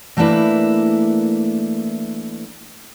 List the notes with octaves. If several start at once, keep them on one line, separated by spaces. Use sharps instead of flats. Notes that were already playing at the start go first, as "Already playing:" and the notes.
E3 A3 A#3 D4 E4 B4